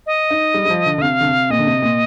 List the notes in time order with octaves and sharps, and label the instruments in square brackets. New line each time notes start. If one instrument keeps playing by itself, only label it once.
[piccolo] D#5
[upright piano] D#4
G3
G3
F3
D3
D3
[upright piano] C3 [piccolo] F5
[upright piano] D3
C3
[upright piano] A#2 [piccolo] D#5
[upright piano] D3
C3
A#2